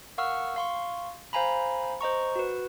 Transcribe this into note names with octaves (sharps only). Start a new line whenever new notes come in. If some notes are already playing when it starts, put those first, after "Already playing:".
A#4 F5 F#5 C#6 E6 F6
F5 C6 C#6
C5 F5 G#5 A#5 B5
C5 D#5 A#5 C#6
F#4 B4